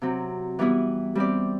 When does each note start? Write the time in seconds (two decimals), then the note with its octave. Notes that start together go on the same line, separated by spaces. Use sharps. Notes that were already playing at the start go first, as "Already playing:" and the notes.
0.02 C3 F#3 C4
0.59 E3 G3 B3 E4
1.15 G3 C4 G4 D5